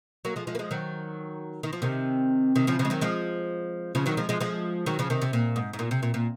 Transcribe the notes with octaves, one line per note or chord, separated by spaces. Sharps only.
F#3 A#3
F3 G#3
F3 G#3
A#3
F3 G#3
D#3 F#3
D#3
F3
C3 D#3
C3 D#3
C#3 F3
C#3 F3
G#3
D#3 F#3
F3 G#3
C#3 F3
D#3 F#3
F3 G#3
F3 G#3
F3 G#3
D#3 F#3
C#3 F3
C3 D#3
C3
A#2
G#2
G#2
A#2
C3
A#2
A#2